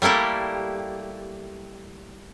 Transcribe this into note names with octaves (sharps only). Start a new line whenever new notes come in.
G3 A3 A#3 E4 G4